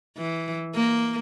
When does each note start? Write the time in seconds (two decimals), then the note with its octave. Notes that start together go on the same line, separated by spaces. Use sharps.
0.18 E3
0.75 A#3